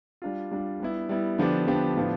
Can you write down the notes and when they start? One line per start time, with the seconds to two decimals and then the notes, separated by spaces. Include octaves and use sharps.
0.22 G3 D4 F4
0.51 G3 D4 F4
0.80 G3 B3 E4
1.09 G3 B3 E4
1.38 D3 F3 B3 D4 G4
1.67 D3 F3 B3 D4 G4
1.97 A2 F3 B3 D4 F4